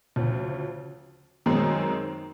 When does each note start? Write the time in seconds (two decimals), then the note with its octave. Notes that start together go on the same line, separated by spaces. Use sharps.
0.16 D2 C#3 F3
1.46 F#2 D#3 G#3 C4 D#4